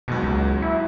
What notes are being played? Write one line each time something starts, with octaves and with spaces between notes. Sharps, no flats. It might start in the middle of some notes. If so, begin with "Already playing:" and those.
D#2 G#2 B2 F#3
C#2
E4